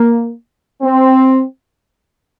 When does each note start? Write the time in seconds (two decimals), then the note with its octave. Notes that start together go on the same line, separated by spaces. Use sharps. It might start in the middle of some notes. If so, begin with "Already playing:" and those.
Already playing: A#3
0.82 C4